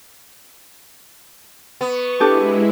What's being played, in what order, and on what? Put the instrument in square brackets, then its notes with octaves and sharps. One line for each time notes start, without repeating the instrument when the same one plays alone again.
[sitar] B3 [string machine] C#6
[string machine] G#3 E4 [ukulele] D4 G4 A4